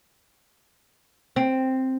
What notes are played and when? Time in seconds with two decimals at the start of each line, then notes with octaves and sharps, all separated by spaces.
1.36 C4